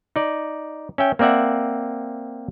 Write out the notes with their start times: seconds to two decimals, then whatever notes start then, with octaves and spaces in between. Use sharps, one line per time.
0.16 D#4 D5
0.98 C#4 E5 G5
1.19 A#3 C4 D5 E5 F#5